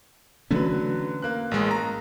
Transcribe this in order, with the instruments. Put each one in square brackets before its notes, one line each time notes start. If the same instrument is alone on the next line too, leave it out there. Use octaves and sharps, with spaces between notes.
[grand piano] D3 F#3 B4 [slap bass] E3 A3 C#4
[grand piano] A#3 F#6
[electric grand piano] A1 G#3
A#5